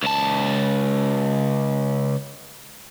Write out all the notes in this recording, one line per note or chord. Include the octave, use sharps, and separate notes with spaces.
C#2 A5